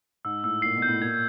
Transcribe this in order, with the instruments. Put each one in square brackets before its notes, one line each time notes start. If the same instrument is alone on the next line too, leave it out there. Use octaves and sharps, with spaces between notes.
[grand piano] G#2 [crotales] E6
[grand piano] A2 [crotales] E6
[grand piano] A#2 [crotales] C7
[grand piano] B2
[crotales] G6
[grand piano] A2
[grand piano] A#2 [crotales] G#6